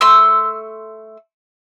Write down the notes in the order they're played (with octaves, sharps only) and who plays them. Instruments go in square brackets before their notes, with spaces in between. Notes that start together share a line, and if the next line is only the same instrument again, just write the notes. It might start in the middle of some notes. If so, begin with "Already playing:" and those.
[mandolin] A3 C6 E6